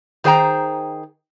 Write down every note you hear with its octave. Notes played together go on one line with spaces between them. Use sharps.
D#3 G#4 C5 G5 A#5